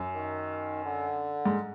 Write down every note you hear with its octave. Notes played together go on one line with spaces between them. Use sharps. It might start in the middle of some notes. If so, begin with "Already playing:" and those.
Already playing: F#2
D#3
D3
G#2